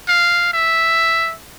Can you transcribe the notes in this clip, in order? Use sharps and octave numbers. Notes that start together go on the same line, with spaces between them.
F5
E5